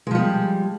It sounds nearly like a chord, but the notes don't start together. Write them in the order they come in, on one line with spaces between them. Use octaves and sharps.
G#3 F3 G3